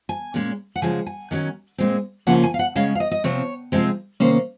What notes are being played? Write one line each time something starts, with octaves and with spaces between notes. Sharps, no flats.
G#5
A#2 G#3 C#4
F#5
C#3 F3 G#3 G#5
G#5
D#3 F#3 C#4
A#2 G#3 C4
C#3 F3 A#3 C#4 F#5
G#5
F5
F#5
C#3 G#3 C#4 F5
F5
D#5
D#5
C3 F3 C4 C#5
C3 F3 G#3 C4
C3 D#3 A#3 C#4 C5